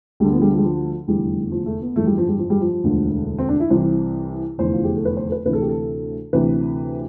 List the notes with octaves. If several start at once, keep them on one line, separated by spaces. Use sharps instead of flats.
D2 D3 G3
B3
F3
G3
F3
G3
F3
F1 E2 D3 G3
F3
A3
B3
G1 F2 E3 A3
G3
F3
G3
F3
G3
F3
E1 D2 D3
C4
D4
E4
C2 C3 E3 C5
F1 E2 D3 C5
F4
G4
A4
B4
C5
A4
B4
D2 C3 E3 B4
A4
G4
A4
D2 C3 E3 B4